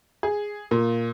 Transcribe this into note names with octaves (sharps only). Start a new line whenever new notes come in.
G#4
A#2